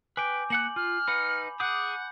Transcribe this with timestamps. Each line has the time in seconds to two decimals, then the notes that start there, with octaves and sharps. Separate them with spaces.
0.17 B4 G5 G#5 D6 G6
0.50 A#3 F#5 F#6 F#7
0.76 F4 F6
1.08 D#4 B4 F#5 B5
1.60 G#4 F#5 D6 D#6 G6